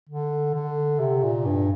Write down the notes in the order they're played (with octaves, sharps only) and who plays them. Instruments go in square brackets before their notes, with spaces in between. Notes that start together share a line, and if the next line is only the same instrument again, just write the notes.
[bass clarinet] D3
D3
C3
A#2
G2